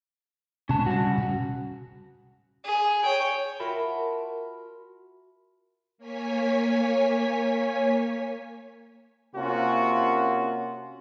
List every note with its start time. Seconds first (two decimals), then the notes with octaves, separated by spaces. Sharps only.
0.69 B2 G#3 C#4 A5
0.86 C#3 G3 C#4 F#4
1.18 B2 G3
2.64 G#4
3.03 C#5 G5
3.59 F4 F#4 A#4 E5 A5 B5
5.98 A#3 C#5 G#5 B6
9.35 C3 A#3 C#4 F4 F#4